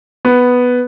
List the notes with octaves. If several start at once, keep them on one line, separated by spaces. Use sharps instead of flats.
B3